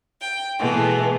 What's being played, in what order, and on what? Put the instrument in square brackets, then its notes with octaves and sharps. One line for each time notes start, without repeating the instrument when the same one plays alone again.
[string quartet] G5
B2 E3 G#3 A3